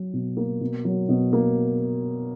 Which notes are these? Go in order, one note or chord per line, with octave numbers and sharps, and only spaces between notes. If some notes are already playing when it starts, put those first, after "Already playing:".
Already playing: F#3
B2
A#3
B2
F#3
B2
A#3